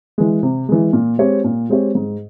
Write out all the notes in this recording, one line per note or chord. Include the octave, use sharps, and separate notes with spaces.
E3 G#3
C3
E3 G#3
A#2
G#3 C4 G4 C#5
A#2
G#3 C4 G4 C#5
G#2